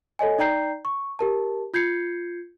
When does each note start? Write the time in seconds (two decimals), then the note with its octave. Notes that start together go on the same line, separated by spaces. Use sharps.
0.19 A4 C#5 D#5 G#5
0.39 D#4 D5 G5 A#5 G6 C7
0.85 C#6
1.19 G4 A#4 A5
1.74 F4 G6 G#6 C7 C#7